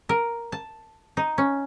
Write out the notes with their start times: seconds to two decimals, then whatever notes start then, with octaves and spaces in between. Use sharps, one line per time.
0.09 A#4
0.52 A5
1.17 D#4
1.38 C#4